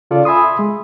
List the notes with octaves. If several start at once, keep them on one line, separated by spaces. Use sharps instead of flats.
C#3 F4 A4 D5
E5 G#5 B5 C6 D#6
G#3